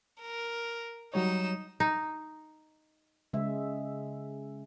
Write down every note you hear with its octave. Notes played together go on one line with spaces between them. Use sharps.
A#4
F#3 G3 D#4 C#5 E7
D#4
C#3 G#3 E5